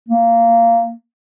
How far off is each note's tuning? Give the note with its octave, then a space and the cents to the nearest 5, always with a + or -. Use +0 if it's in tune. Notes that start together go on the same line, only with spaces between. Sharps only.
A#3 -20